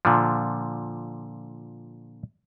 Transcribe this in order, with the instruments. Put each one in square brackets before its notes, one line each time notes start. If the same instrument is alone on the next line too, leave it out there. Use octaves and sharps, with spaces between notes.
[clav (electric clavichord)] A#2 D3 F3